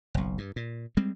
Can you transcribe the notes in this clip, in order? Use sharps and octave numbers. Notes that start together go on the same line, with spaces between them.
F#1 B1
G2
A#2
G3 G#3 C4